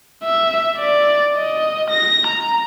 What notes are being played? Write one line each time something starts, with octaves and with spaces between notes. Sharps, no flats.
E5
D5
D#5
A#6
A#5